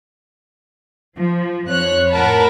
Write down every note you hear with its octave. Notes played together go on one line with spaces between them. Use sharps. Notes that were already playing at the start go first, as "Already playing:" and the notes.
F3
F2 C#5 F#6
A2 A#4 F#5 A5 B5